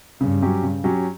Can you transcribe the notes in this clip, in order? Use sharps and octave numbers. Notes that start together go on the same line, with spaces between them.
G2 C#3
F#3 C#4 G4
C#3
F#3 C#4 G4